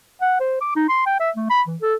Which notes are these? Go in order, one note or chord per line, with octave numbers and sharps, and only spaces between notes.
F#5
C5
D6
D#4
C6
G5
E5
A3
B5
E3
A4